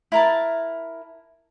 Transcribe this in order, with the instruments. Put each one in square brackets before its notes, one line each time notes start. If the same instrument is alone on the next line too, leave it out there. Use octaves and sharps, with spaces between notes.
[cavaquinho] E4 A#4 A5